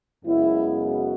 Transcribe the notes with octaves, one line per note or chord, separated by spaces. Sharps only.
F#2 C#3 G#3 B3 E4
F#4